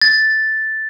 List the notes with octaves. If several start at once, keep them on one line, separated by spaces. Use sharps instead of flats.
A6